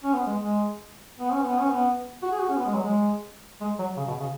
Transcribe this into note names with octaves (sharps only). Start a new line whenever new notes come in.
C#4
B3
G#3
G#3
B3
C#4
B3
C#4
B3
F#4
G#4
F#4
C#4
B3
G#3
F#3
G#3
G#3
F#3
C#3
B2
C#3